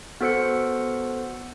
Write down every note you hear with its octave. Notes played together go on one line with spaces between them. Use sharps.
B3 F#4 A4 C5 F#5 C#7